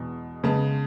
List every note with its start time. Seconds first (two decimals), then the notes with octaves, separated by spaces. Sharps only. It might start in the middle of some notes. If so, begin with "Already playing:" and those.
Already playing: E2 B2 G#3
0.44 C#3 G#3 B3 A5